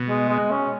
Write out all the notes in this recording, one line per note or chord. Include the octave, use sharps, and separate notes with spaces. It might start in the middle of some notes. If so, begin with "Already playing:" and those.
Already playing: B2
G#3
G#3
C#4